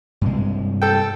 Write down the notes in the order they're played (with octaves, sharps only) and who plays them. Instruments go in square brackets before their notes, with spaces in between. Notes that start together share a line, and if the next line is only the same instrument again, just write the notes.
[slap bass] G2 C3 G#3
[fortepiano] A4 G5